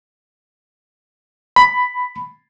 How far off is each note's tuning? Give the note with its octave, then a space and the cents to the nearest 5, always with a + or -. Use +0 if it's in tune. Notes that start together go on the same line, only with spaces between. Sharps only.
B5 +10